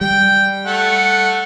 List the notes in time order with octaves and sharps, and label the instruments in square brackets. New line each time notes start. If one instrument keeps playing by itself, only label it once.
[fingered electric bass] G3 [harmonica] G5
[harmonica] A3 F#5